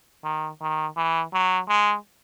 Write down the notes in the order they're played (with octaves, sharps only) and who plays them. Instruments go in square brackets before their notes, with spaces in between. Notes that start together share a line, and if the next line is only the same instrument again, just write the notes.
[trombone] D#3
D#3
E3
F#3
G#3